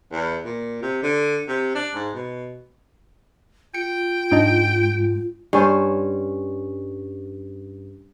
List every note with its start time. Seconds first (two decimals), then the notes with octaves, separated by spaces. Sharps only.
0.12 E2
0.45 A#2
0.82 C3
1.03 D3
1.48 C3
1.75 D4
1.95 G#2
2.15 B2
3.74 F4 G5 C#7
4.31 G#2 D4 D#4 D#5
5.53 G2 C#4 C5